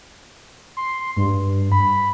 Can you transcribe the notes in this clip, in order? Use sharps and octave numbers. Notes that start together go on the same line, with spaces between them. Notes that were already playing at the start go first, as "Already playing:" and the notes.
C6
G2
B5